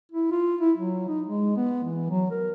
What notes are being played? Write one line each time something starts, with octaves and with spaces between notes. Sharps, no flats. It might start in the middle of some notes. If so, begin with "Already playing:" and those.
E4
F4
E4
F#3
D#4
G#3
B3
E3
F#3
A#4